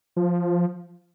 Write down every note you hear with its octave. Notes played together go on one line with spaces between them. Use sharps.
F3